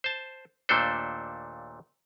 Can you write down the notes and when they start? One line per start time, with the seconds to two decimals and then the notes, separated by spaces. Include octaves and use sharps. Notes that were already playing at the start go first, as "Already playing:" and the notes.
0.04 C5 A5
0.69 D#2 A#2 A3 D4 A4 C5